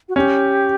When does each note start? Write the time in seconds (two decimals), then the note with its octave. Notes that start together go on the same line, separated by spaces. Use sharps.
0.09 F#4
0.16 C#4 G4